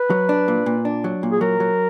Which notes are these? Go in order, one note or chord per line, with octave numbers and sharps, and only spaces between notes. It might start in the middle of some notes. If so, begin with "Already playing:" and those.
Already playing: B4
F#3
D4
A#2
A#2
D4
F#3
A#2
G#4
F#3 A#4
F#3